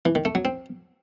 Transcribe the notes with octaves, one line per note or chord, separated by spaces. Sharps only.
E3
D#3
A3
F#3
C4